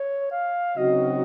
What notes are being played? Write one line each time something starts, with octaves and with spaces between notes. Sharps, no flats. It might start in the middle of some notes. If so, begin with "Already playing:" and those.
Already playing: C#5
F5
C#3 F#3 C4 D#4 F#4 D#5